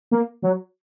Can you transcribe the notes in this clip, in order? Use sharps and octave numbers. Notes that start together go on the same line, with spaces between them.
A#3
F#3